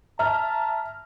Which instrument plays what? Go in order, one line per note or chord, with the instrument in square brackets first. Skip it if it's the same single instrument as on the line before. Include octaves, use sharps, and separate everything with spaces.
[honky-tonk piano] E5 A#5 F6 [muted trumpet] A5